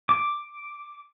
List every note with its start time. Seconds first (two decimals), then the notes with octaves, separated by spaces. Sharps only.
0.09 D6